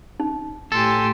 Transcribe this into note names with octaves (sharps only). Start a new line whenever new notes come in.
D#4
A2 G4 A4 G#5 C6